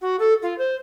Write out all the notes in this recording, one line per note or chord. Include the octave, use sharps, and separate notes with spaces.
F#4
A4
F4
C5